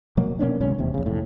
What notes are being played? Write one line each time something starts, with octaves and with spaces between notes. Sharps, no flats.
B2 F#3 A#3
B2 A#3 C#4 D4
G#1 C#2 C3 C#4
E1 D#2 C3
A#1 C#3
F1 A2